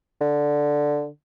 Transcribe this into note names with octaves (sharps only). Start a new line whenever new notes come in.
D3